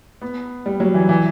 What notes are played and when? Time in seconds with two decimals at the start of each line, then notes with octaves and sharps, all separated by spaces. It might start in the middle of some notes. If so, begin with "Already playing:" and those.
0.22 B3
0.66 G3
0.80 F#3
0.94 E3
1.09 E3